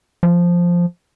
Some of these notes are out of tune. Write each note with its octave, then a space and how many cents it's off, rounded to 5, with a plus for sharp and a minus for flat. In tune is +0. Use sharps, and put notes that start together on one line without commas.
F3 +0